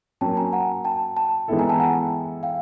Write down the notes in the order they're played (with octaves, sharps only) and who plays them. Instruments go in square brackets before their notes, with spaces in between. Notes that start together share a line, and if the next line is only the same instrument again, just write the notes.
[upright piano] F#3 A#3 C#4 [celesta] G5 A5
[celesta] G#5 A#5
F#5 G#5
G5 A5
G5 A5
[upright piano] E3 G#3 B3 E4 A4
[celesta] G#5 A#5
G5 A5
F#5 G#5
F5 G5